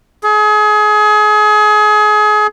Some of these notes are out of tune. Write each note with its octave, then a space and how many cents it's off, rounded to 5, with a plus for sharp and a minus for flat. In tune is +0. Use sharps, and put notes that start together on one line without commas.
G#4 +30